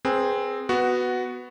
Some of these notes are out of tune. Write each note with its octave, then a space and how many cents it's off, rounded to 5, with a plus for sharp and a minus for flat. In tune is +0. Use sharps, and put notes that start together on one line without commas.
C4 +0 G#4 +0 B4 -30
B3 +5 F#4 +0